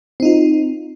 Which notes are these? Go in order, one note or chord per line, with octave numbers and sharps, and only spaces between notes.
C4 D#4 F4